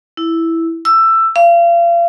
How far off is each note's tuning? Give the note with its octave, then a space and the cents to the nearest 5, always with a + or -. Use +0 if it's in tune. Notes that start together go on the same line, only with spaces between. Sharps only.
E4 +0
E6 +15
F5 -35